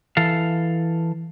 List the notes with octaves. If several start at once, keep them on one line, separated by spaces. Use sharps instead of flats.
E3 A4 F5